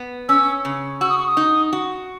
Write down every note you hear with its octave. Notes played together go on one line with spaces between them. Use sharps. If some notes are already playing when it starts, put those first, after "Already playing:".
Already playing: B3
C#4 E6
C#3
F#4 E6
D#6
C#6
D#6
D#4
F#4